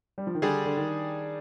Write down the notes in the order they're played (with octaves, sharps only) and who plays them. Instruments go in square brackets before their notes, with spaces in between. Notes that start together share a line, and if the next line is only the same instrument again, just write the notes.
[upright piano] G3
F3
D#3
[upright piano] D3 [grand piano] G3 D4 G#4
[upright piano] D3
D#3